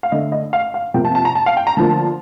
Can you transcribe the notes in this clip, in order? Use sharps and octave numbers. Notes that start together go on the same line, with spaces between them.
F5
D3 A3 D#5
D#5
F5
F5
C3 F3 A#3 G5
A5
A5
A#5
A5
F5
G5
A#5
D3 F3 A#3 A5